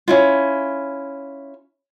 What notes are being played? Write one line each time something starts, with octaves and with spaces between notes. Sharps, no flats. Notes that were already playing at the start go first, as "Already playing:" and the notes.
C#4 E4 F4